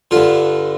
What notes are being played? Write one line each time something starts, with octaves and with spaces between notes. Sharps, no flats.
G2 D3 F4